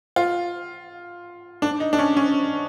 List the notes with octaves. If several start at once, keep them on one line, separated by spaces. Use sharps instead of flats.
F4
D4
D#4
D4
C#4
C#4